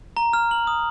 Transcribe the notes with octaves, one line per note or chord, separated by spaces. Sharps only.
A#5
F6
F#7
D#6